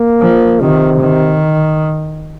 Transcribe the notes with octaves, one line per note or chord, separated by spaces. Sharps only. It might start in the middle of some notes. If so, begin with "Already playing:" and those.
Already playing: A#3
F3
C3 D#3
D#3